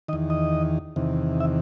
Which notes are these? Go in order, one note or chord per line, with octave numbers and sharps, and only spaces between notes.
E2 D#3 D#5
D#5
E2 C3 D#3
E5